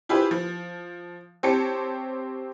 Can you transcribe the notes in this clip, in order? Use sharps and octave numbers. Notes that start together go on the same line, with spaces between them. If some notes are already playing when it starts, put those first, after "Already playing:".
E4 F4 G4 G#4 B4 C5
F3
C4 G4 C#5 A5 C#7